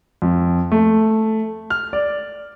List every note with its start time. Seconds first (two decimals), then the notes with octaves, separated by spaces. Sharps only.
0.22 F2
0.72 A3
1.70 F6
1.93 D5